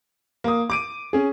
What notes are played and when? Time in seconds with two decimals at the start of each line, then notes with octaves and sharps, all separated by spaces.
0.44 A#3 D#6
0.70 D6 D7 D#7
1.13 C#4 G#4